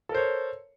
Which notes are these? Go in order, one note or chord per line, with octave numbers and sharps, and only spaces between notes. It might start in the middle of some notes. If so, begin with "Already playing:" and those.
A4 A#4 C5 C#5